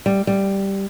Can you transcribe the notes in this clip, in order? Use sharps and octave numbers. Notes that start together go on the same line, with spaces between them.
G3
G3